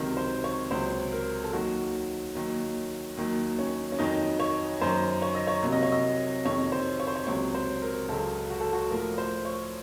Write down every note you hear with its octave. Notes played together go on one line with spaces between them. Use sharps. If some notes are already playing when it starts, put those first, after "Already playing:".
Already playing: C#2 C3 D#3 F#3 A#4
C5
C#5
C#2 C3 F#3 C5
A#4
A4
D#2 D#3 F#3 F#4
D#2 D#3 F#3
D#2 D#3 F#3
C#4
C#4
F2 D#3 F#3 D#4
C#5
F#2 D#3 F#3 C5
C#5
D#5
C#5
C2 C3 F#3
D#5
C#5
D#5
F2 C3 D#3 F#3 C#5
C5
C#5
C5
C#5
C#2 C3 F#3 C#5
C5
A#4
C#2 C#3 F#3 A4
F#4
A4
F#4
A2 F3 A#4
C5
C#5